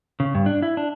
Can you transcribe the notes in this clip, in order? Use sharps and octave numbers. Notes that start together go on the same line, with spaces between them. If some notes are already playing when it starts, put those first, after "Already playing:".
C#3
G2
D4
E4
D4